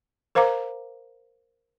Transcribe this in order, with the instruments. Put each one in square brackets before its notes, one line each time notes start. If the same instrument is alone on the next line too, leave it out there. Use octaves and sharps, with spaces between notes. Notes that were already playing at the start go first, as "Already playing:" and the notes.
[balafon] A#4 C5 F5 A#5 D6